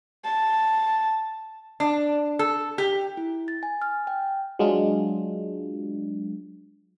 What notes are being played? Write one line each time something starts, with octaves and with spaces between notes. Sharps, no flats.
A5
D4
A4
G4
E4
A6
G#5
F6
G5
F#3 G#3 D4 F4